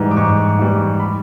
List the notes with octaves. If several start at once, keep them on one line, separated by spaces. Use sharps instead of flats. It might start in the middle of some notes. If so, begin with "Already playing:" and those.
Already playing: G#2 E3 G3
D6
G#2 C#6
E3 G3
B5